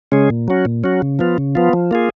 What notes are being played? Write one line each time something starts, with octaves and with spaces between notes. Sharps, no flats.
C#3 G#3 C#4 G#4
A#2
F#3 C#4 F#4
A#2
F#3 C#4 F#4
C#3
F3 B3 F4
C#3
F3 B3 F4
F3
A#3 F4 G#4